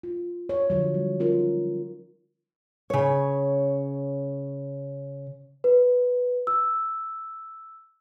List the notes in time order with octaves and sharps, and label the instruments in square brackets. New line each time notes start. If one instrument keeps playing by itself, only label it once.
[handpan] F4
C#5
D3 F3 F#3
G3
C#4 D#4 F4 A#4
[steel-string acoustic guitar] C#3 C#5
[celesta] B4
E6